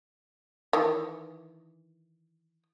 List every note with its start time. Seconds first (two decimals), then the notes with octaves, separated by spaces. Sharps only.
0.73 D#3 E3